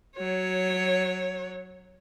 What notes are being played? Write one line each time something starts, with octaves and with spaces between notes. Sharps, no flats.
F#3 C#5